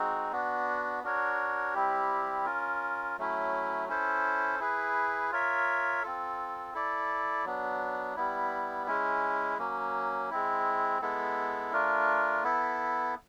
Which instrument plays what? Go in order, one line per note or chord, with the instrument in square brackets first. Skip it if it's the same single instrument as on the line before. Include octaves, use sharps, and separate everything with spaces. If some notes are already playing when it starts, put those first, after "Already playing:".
Already playing: [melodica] G#3 C4 D#4 F#4
B3 D4 F#4
D4 F#4 A#4 C#5
G3 C4 E4 G4
C#4 F4 A#4
F#3 A3 C#4 E4
C#4 E4 A4 C5
E4 G#4 B4
F4 A#4 C#5 E5
C4 F4 A4
E4 A4 D5
F#3 B3 D4
G3 B3 E4
G#3 C#4 E4
F#3 A#3 C#4
G#3 C4 E4
G#3 B3 E4 A4
A3 D4 F4 A#4
B3 E4 A4